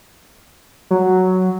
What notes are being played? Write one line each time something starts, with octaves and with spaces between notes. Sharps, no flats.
F#3